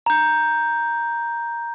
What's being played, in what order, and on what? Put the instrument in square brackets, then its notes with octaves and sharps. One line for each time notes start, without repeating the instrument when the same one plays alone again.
[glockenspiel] A#5 G6